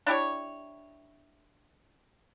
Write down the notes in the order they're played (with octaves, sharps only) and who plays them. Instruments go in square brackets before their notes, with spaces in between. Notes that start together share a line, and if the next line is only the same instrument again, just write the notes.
[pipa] D4 E4 G4 C#5